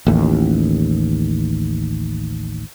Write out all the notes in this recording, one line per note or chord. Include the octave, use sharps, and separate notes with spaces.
A1 D#2